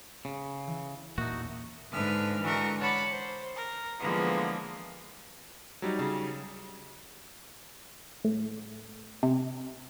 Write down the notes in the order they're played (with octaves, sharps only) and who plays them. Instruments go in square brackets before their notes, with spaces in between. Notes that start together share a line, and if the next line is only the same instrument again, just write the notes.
[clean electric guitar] C#3
[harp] E3
[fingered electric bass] E2 A#2 A#3 [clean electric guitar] D#4 F#4 [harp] E5 A5
[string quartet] G#2 D3 G#3 B4 E5 F6
D3 E3 G#3 F#4 A#4 C#6
C#5 F#5 A5 B5 D6
C5
A#4
D3 E3 F3 G#3 A#3 B3
[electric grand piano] F#3 G3 D#4
[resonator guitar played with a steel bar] C#3
[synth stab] A2
C3